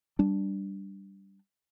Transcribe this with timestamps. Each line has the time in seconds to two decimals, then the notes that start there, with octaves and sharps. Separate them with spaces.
0.19 G3 D4